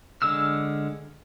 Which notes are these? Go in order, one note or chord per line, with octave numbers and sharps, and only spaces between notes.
D3 G#3 E6 F6